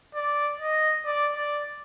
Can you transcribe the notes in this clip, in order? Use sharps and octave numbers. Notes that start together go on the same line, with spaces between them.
D5
D#5
D5
D5